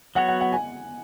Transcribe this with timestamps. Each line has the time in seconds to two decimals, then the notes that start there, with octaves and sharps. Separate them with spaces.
0.15 F#3 B3 F#4 C#5 F#5
0.28 F#5
0.41 F#5
0.52 G#5